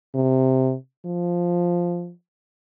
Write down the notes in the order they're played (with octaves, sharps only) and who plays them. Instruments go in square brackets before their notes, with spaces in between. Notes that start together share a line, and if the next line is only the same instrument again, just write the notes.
[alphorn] C3
F3